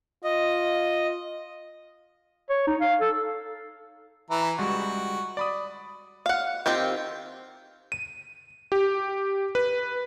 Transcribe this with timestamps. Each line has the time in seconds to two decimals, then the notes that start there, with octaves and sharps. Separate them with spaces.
0.24 F4 D#5
2.50 C#5
2.67 D#4
2.81 F5
3.01 A4
4.30 E3 E4 A#5
4.58 C#2 G3 G#3 F#4
5.37 D5 B5 D#6
6.26 F5 F#5
6.66 D#3 C4 F4 G4
7.92 D#7
8.72 G4
9.55 B4